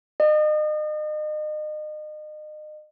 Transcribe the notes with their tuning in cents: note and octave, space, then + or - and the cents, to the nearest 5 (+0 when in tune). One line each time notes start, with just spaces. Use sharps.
D#5 -35